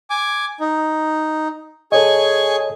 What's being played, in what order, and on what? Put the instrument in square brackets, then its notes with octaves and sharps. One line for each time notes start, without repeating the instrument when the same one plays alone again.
[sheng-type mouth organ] G#5 D6
D#4
[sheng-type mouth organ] G#4 G#5 C#6 [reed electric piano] A4 C#5 D#5